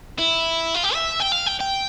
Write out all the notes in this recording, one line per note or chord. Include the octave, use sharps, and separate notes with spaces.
E4
F4
G4
E5
G5
F5
G5
G5